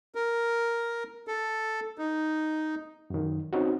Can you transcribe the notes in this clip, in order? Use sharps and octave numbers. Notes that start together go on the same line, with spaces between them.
A#4
A4
D#4
F#2 D#3
C4 C#4 D#4 F#4